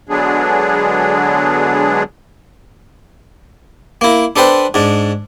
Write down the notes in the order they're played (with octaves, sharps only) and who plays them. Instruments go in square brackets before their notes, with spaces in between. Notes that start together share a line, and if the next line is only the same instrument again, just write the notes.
[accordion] D3 F#3 G#3 B3 D4 G#4
[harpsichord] A#3 E4
D4 A4 B4 C5 G5
G#2 D4